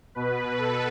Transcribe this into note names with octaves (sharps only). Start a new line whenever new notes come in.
B2 B4
A4